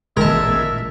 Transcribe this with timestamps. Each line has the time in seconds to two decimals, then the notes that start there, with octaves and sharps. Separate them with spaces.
0.17 A1 A#2 G#3 A#4 E5 A5 G#6